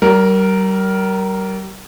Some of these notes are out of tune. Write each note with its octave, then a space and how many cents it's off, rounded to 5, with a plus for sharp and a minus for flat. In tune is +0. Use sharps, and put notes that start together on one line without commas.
G3 -40 A#4 +0